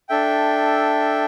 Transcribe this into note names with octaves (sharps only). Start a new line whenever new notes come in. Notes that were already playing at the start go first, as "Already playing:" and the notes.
D4 A4 E5 G5